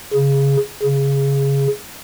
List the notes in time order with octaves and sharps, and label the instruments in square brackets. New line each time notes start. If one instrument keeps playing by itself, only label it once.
[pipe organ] C#3
C#3